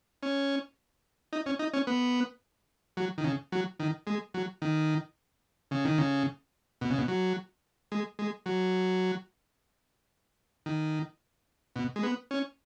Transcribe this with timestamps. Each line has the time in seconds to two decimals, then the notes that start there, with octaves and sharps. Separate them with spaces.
0.23 C#4
1.33 D#4
1.46 C#4
1.59 D#4
1.74 C#4
1.87 B3
2.97 F#3
3.18 D#3
3.24 C#3
3.52 F#3
3.80 D#3
4.07 G#3
4.34 F#3
4.62 D#3
5.71 C#3
5.85 D#3
5.98 C#3
6.81 B2
6.90 C#3
6.98 B2
7.08 F#3
7.92 G#3
8.19 G#3
8.46 F#3
10.66 D#3
11.76 B2
11.96 G#3
12.03 B3
12.31 C#4